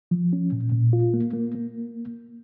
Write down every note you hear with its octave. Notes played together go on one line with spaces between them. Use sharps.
F3
C#4
A#2
A#2
F4
A#3
A#3
A#3